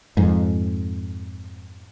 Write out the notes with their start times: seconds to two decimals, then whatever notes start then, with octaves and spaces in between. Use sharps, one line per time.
0.17 F2 G#2